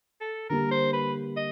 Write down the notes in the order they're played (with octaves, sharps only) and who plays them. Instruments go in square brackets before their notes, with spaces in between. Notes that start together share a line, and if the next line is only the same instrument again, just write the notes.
[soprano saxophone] A4
[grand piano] D3 G3 A#3 [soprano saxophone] A#4
[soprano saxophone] C5
B4
D#5